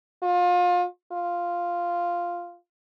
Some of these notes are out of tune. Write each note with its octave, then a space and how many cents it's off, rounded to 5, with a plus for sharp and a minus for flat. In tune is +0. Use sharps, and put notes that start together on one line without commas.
F4 +30
F4 +0